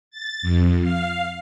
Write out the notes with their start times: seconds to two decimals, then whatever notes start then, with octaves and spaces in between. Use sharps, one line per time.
0.11 A6
0.42 F2
0.81 F5